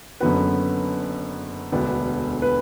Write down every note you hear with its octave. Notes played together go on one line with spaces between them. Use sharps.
F#1 F#2 D3 B3 F#4 B4
E1 D2 D3 B3 D4
B4